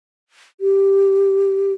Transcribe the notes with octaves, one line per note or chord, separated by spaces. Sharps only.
G4